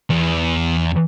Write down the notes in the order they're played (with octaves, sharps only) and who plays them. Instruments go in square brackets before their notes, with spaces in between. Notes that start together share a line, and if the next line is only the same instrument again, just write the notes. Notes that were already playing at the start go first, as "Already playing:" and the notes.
[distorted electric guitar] E2